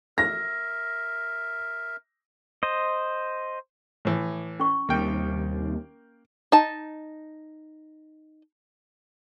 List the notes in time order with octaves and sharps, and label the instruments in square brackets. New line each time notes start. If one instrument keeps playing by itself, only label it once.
[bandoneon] A#4 E5 [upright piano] A#6
[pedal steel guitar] C5 D#5
[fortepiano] A2 E3
[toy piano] C#4 C#6
[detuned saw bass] D#2 [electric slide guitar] C3 G3 [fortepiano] A#3 G5
[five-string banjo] D#4 A5